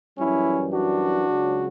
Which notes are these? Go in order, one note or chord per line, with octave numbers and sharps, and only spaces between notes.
F#2 E3 G3 C#4 E4
D4 F#4
C#2 C#3 F#3